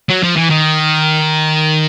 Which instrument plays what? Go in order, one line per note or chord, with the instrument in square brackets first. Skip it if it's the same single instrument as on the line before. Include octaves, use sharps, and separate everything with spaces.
[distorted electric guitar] F#3
F3
E3
D#3